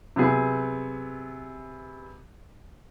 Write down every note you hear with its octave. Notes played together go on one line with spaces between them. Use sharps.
C3 F#3 B3 G#4